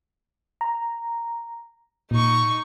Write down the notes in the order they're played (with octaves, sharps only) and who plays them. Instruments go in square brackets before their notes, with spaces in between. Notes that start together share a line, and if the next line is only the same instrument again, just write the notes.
[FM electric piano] A#5
[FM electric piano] A#2 [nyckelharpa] D#4 C#6